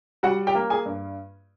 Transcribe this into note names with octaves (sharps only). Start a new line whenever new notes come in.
G3 F#4 F#5
G4 G5
A#3
G#4 G#5
G2